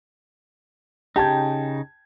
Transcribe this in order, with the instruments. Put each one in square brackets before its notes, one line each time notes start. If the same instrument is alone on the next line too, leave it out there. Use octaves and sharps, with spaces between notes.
[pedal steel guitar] C#3 D#4 [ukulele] G4 [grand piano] G5 A5 G#6